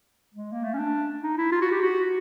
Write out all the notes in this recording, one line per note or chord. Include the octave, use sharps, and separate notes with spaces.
G#3
A#3
A3
C#4
D4
D#4
E4
F4
F#4
G4
F#4